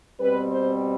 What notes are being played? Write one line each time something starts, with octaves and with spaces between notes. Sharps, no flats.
B2 G3 C4 B4
C5